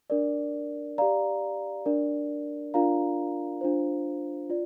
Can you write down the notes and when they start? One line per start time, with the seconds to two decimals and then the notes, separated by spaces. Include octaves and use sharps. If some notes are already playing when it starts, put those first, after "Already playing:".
0.10 D4 A#4 D5
0.98 G4 D5 F5 A#5
1.86 D4 A#4 D5
2.74 D4 F4 A#4 D5 F5 A#5
3.61 D4 F4 C5
4.50 F4 D5